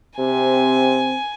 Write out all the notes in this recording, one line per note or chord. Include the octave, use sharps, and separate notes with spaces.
C3 C4 G#5